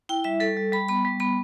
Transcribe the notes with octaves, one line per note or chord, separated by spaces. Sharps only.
E4 G5
G3 E5
G3 A4
G3
G3 B5
B3 B5
G3
B3 B5